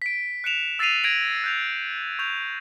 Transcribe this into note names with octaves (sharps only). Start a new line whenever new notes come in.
B6 D7
F#6 C#7 D7 E7 F7
E6 A6 B6 C7 D#7 F7
G#6 A#6 D7 F7 F#7
F#6 G6 F7
C#6 G6 F7